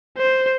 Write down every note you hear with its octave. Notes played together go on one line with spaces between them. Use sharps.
C5